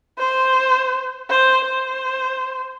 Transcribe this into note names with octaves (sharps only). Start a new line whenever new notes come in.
C5
C5
C5